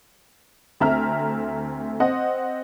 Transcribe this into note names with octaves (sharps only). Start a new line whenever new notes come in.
D2 A3 C4 E5 A#5 F6
C4 C5 D#5 F#5